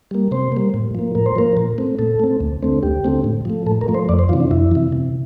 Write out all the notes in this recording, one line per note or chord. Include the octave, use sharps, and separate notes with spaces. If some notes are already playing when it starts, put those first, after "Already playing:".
G3 A#3
C3 C5
G3 A#3
A2
F3 A#3
A2 A#4
C5
F3 A#3 A#4
A#2
A3 C4
A#2 A4
A3 C4
D2
D3 A3 C4
D2 G4
D3 A3 C4
A2
F3 A3
A2 A4
A#4
F3 A3
C5
F2 D5
C5
C3 E3 F4
D4
F2 E4
C3 E3
C3